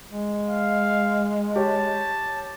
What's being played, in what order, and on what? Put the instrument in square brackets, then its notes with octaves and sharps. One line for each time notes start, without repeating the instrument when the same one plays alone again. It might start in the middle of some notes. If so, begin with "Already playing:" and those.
[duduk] G#3
[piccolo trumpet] F5
[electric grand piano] G4 C#5 [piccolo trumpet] A5